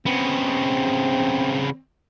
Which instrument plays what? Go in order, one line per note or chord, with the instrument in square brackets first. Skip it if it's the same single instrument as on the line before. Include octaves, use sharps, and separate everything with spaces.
[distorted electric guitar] C#3 B3 [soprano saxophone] C4